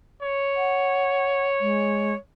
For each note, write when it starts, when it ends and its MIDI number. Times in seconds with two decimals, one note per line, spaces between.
0.23 2.18 73
0.56 1.48 78
1.61 2.14 56